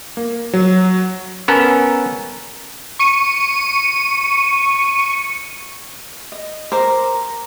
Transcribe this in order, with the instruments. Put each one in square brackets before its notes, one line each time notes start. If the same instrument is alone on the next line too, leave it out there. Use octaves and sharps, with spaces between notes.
[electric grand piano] A#3
F#3
[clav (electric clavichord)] B3 C#4 A4 A#4
[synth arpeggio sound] C#6 C#7 D#7
[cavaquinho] D#5
A#4 C5 A#5 D6